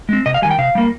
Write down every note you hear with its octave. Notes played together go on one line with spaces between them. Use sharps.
G#3 C4
C3 D#5
F5
D#3 G3 G#5
G5
C3 F5
G3 A#3